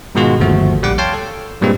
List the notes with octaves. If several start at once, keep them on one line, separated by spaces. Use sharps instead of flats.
G#2 B2 D#3 G#3 F4 F#4
G1 D#2 F3 A3 F#4
A#1 G3 F#5 D6
C#5 F5 G5 A5 C6
A4
G2 A#2 G3 G#3 A#3 C4